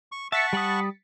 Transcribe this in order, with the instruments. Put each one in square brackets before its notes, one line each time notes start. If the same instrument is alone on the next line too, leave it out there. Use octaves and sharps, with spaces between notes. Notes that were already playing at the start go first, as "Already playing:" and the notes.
[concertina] C#6
[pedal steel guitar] E5 [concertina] F#5 A5 C#6 [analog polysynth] A6 B6 C#7
[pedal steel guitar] G3 B5 D#6